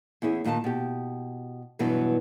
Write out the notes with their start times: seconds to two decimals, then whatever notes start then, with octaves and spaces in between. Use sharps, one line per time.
0.22 E2 C#4 E4 G#4
0.44 D#2 A#2 D#3 G#5 A5
0.64 B2 G4
1.79 E2 G2 B2 E3 F#3